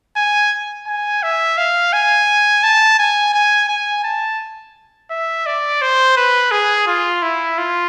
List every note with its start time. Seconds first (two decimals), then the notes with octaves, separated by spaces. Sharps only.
0.17 G#5
0.87 G#5
1.23 E5
1.58 F5
1.93 G#5
2.63 A5
2.99 G#5
3.34 G#5
3.69 G#5
4.04 A5
5.11 E5
5.46 D5
5.82 C5
6.17 B4
6.51 G#4
6.87 F4
7.22 E4
7.58 F4